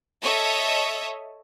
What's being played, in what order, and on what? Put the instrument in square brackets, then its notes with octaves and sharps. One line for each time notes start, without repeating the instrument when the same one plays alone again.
[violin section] A4 C#5 D#5 E5